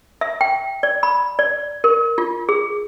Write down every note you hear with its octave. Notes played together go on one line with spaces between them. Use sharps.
E5
G5
D5
B5
D5
A#4
F4
G#4